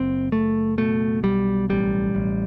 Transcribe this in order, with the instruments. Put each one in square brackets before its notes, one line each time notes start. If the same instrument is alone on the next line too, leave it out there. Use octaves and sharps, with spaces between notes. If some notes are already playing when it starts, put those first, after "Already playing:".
Already playing: [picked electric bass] F#1 C4
F#1 A3
B2 A3
B1 G3
A1 G3
A1